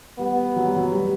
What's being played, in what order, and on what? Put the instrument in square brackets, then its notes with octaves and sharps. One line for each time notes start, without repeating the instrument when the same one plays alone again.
[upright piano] G3 [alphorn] B3
[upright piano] F#3
G3
F#3
G3